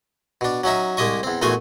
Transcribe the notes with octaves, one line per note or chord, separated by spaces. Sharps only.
B2 D4
F#3 C#4 D#4 E5
C2 G#3 G4 D#5 C#6
E2 C4
A#1 E2 A3 F#4 G#5 C6